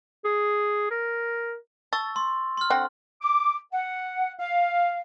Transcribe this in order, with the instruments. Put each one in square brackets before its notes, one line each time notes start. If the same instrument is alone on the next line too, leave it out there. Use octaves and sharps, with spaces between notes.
[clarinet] G#4
A#4
[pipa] A5 [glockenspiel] C#6 E6 A6
[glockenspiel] C6
C6 F6
[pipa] D3 C4 F#5
[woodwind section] D6
F#5
F5